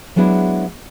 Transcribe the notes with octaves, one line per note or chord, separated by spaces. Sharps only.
F#3 G#3 B3 D4 E4